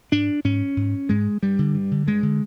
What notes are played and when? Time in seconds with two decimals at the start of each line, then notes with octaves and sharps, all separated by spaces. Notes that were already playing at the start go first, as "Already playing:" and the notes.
0.12 G#2 D4
0.44 G#2 C#4
0.77 G#2
1.09 G#2 G#3
1.43 G2 G3
1.59 D3
1.74 G2
1.91 D3
2.06 G2 G#3
2.23 D3